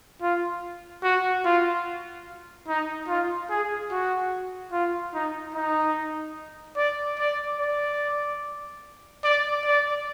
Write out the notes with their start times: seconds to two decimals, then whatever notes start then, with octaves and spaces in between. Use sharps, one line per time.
0.22 F4
1.03 F#4
1.45 F4
2.68 D#4
3.08 F4
3.50 G#4
3.91 F#4
4.72 F4
5.14 D#4
5.55 D#4
6.77 D5
7.19 D5
7.60 D5
9.24 D5
9.65 D5